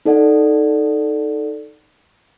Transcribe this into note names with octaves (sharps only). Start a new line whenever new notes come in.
D#4 A4 D5 F#5